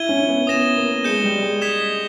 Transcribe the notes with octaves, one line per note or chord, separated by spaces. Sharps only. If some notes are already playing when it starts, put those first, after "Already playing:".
Already playing: E4 G#6 D#7 G7
C#4
B3
B3 D#6 A#6 E7 G7
A#3
G#3 G6 C#7 E7 G7
G3
G#3
D#6 G#6 B6 E7